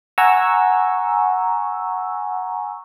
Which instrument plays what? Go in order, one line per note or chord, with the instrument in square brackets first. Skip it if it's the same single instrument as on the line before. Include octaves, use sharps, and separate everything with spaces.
[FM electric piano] F#5 G#5 A#5 C#6 E6